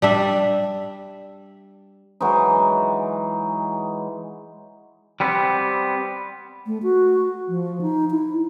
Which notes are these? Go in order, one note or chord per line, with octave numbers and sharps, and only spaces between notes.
G3 D4 E5
E3 F#3 G#3 D#4
G3 B3 C4
A3
F#4
F3
D#4
E4